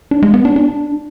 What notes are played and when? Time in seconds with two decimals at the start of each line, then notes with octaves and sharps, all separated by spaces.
0.11 D4
0.23 G#3
0.34 B3
0.45 D4
0.56 D4